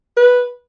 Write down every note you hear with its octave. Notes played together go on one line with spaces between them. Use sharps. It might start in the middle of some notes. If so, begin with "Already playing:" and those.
B4